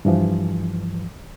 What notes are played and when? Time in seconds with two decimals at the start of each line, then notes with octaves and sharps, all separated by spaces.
0.05 G2 E3 F3